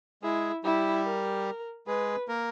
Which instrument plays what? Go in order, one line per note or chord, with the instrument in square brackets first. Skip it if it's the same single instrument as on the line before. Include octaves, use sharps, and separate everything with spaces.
[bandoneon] G#3 G#4 [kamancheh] E4
[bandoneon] G3 G4 [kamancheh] E4
[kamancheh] A#4
[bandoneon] G#3 G#4 [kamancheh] B4
[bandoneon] A#3 A#4